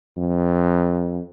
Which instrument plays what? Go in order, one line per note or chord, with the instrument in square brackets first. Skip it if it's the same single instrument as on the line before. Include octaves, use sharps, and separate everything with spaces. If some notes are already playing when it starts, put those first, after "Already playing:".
[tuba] F2